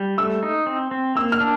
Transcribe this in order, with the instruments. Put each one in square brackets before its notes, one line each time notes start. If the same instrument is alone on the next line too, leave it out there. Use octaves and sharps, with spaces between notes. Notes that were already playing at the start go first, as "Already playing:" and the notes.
Already playing: [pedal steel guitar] G3
[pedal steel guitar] A3 [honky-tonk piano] E6
[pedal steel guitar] D#4
C4
C4
[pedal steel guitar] A#3 [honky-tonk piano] E6
[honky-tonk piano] F6
[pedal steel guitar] D4